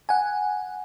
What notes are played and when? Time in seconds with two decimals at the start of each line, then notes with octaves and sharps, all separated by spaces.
0.09 F#5 G#5